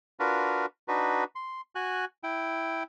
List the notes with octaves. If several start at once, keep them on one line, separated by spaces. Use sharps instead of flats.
D4 F4 F#4 A#4 B4
D4 D#4 F#4 B4
C6
F#4 G#5 F#6
E4 G5